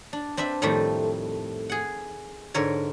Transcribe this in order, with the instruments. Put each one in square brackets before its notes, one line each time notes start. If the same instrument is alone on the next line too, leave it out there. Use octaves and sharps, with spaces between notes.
[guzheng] D4
C4 D4 B4 E5
F2 A2 D#3 G3 A3
G#4 F#5
G#2 D3 A#4 C#5